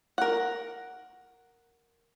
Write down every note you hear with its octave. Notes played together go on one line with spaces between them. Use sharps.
A#4 F#5